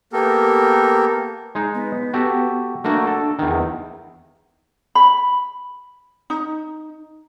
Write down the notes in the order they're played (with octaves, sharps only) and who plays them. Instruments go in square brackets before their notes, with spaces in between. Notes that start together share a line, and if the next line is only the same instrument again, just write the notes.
[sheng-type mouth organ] A#3 B3 G4 A4 A#4
[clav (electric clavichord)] G#3 D#4
[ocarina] B3
[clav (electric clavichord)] F#4 G4 A4
[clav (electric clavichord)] A3 A#3 F#4 [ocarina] D4
[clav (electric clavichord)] A4
E2 D#3
[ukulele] B5
D#4